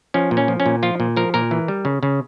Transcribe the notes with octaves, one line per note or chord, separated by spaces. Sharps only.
F3 C#4
A#2
C#4
F3
C#4
A#2
F3 F4
A#2
F3 A#4
A#2 A#4
E3
G3
C#3
C#3